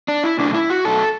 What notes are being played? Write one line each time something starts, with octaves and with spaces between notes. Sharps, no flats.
D4
E4
B2 F#3 A3 D4
E4
F#4
B2 F#3 A3 A4